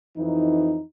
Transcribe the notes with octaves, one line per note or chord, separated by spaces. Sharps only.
F2 E3 D#4